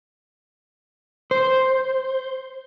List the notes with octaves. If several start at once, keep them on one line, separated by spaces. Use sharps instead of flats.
C5